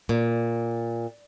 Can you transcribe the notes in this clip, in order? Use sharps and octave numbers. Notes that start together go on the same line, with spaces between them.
A#2